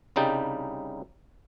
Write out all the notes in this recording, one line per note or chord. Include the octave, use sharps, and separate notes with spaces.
C2 C#3 G3 D#4 G5 A5